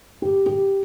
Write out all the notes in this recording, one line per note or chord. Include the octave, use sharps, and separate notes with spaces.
G4
G4